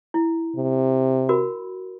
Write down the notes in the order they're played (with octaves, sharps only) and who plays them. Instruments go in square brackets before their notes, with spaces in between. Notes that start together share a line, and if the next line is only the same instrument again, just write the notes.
[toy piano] E4
[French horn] C3
[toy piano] F#4 A#4 B5